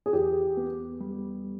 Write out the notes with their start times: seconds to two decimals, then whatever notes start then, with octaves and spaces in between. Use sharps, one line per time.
0.06 G#4
0.13 E2 G4
0.57 B3
1.01 G3